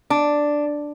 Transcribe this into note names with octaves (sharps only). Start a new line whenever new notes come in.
D4